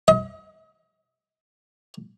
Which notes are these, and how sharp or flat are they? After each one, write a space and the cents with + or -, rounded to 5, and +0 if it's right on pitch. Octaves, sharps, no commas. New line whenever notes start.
D#5 +35